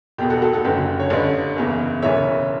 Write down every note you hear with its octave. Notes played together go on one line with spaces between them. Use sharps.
E1 E2 B2 G4
F#4 A4
F#4 A4
F#4 A4
F#1 F#2 D3 G4 B4
C#5
A1 G2 D3 B4 D5
F#1 E2 C#3 E3
E1 D2 C#3 E3 C#5 E5